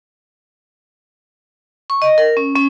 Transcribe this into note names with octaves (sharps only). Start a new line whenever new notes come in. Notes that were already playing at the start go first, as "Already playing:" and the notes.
C#6
D#5
A#4
C#4
C#4